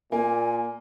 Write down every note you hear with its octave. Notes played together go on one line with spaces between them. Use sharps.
A#2 A#3 G#5